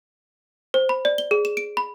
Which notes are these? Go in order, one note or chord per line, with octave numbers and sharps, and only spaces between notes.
C5
B5
D5
G7
G#4
E7
D7
B5